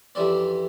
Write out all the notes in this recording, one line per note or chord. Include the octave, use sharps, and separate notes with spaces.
F2 E3 G3 C4 D5